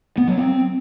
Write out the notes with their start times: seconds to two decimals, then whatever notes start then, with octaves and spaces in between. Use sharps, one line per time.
0.18 B3
0.28 F#3
0.38 C4